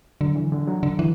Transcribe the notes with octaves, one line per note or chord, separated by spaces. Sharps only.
D3 F#3
E3
D3
F#3
D3
E3